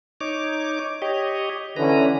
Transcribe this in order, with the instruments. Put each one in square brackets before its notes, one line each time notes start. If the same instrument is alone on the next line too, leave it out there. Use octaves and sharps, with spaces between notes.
[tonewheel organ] D#4 C#5 D6
G4 C#5 D#5
[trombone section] D3 E3 C#4 [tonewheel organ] B4 A#5